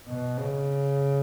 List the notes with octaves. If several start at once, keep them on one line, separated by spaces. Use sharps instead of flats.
B2
C#3